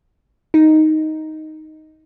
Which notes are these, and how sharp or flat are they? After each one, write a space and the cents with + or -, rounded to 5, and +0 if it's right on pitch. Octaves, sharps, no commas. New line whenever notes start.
D#4 +5